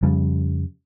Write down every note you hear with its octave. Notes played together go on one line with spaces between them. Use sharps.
F2 C#3 G3